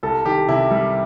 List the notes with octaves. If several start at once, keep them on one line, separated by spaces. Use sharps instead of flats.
C2 A4
D#3 G4
C3 E4
G3